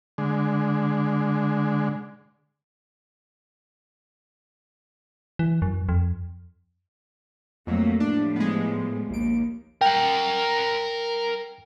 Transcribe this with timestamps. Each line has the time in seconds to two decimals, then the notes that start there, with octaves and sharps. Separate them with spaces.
0.18 D3 G#3
5.39 E3
5.62 F#2
5.89 F2
7.67 F2 F#3 A3 A#3
8.00 A2 F3 G3 D4
8.36 G#3 B3
9.10 A#1 D#2 D7
9.81 A#4 F#5 G5